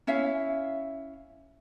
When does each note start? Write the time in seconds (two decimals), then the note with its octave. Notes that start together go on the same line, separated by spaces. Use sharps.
0.07 C#4 E4 E5 F5